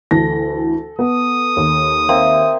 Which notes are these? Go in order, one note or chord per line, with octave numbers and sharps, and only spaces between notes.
D2 E3 A4 A#6
B3 D#6
D#2
A#3 C4 E5